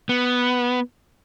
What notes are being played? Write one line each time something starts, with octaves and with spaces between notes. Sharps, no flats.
B3